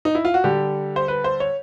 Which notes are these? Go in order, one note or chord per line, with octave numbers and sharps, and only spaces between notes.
D#4
E4
F4
F#4
D3 G3 G4
C5
B4
C5
C#5